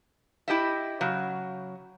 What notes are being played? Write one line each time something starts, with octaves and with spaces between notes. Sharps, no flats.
E4 G4 D#5 E5
C#3 F#3